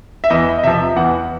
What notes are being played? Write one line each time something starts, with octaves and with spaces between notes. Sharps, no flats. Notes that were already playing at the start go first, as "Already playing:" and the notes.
E5
E2 D#5
D#5
C3 F3 E5
E2 F#5